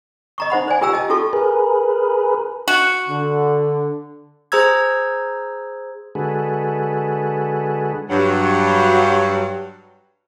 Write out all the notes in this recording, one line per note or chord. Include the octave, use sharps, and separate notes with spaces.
D#5 A#5 C#6
D#4 C5 F#5 B5
C5 D5 G#5
F4 G4 A#4 G5 A#5 E6
D#5 A5
F4 F#4 A4 A5 C#6
G#4 A#4 B4
F#4
D3
G#4 C5 A#5 E6 G#6
D3 G#3 F#4 G#4 A4 B4
G2 F#3